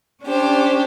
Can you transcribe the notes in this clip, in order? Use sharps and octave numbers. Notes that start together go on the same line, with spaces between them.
C#4 D4 G4 C5